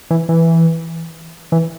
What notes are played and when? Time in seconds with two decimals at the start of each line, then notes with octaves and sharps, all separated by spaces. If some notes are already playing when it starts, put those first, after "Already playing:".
0.10 E3
0.29 E3
1.52 E3